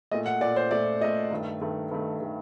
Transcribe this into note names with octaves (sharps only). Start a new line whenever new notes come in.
A#2 A3 D#5
F#5
A#2 A3 D5
C5
A#2 A3 D5
A#2 A3 D#5
G2 D#3 A3
G2 D#3 A3
G2 D#3 A3
D#3 A3